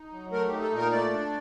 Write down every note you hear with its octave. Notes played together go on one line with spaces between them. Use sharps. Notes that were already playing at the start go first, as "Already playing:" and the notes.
Already playing: D#4
F#3
A3 A#4
D#4 G4
A4
A#2
A#4
A3 D5
D4